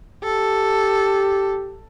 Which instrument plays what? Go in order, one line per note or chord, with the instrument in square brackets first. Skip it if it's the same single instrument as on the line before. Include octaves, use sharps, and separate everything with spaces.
[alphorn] G4 [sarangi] A4